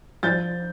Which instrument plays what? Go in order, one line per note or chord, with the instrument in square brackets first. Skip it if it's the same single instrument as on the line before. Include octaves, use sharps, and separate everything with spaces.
[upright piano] F3 G6 A6